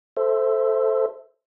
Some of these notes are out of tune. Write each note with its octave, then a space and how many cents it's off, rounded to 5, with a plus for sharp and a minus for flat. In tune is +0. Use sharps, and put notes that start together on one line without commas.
A4 +0 C5 +0 E5 +0